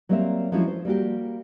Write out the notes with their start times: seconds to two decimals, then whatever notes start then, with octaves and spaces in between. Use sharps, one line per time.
0.09 F#3 G3 A#3 C4 A#4 E5
0.52 F3 F#3 G#3 C4 C#4 E4
0.68 C5
0.85 G3 A#3 F#4 G4